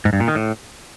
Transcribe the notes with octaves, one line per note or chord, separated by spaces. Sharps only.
G#2
G2
A#2
D#3
A2